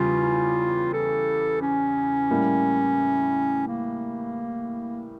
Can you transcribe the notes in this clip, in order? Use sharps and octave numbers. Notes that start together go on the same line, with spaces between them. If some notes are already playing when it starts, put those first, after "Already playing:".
Already playing: E2 C#3 G3 F4
A4
C#4
A2 G3 A#3
A#3